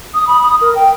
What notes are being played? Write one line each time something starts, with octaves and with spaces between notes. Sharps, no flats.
D#6
B5
D#6
A#4
G5